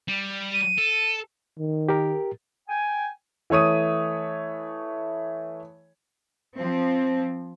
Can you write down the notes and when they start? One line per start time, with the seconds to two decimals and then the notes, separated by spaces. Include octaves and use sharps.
0.08 G3
0.54 D#7
0.78 A4
1.59 D#3
1.89 G4 A#4
2.69 G5 G#5
3.50 E3 A3 C#5 D#6 D#7
6.57 F3 C4